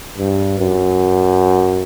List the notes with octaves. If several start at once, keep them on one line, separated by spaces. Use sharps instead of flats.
G2
F#2